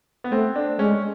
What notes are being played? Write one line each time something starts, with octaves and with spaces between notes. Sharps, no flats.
B3
A3 C4
D4
G#3 C#4